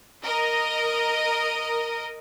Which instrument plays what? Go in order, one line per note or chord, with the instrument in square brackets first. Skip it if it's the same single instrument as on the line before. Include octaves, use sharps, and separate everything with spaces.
[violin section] A#4 D#5